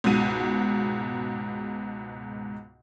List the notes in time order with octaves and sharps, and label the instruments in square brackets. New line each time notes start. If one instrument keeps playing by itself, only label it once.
[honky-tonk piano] C#2 G#2 B2 D#7